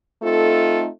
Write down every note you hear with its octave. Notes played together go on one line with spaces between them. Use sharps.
A3 C4 D#4 F4 A4